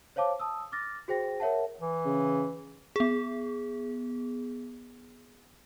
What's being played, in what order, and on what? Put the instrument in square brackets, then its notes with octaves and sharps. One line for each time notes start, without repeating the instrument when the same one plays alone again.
[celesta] C5 C#5 F5 A5 D6
A5 D#6 E6
D6 F6 A6 A#6
F#4 G#4 C5 G5 A#6
A#4 C#5 E5 F#5 A5
[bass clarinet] E3
[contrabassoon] C#3
[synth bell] B3 G#4